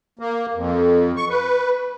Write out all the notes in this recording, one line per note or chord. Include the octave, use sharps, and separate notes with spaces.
A#3
F2
C#6
B4